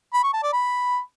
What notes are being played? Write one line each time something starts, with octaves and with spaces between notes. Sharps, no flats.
B5
C#6
A5
D5
B5